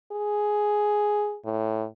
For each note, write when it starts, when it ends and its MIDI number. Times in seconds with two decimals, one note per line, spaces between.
0.12 1.36 68
1.45 1.85 45